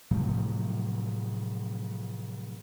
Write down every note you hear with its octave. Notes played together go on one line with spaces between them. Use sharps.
A2 C3 F3 F#3